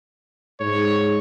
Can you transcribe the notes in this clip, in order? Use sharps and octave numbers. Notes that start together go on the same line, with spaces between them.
G#2 C#5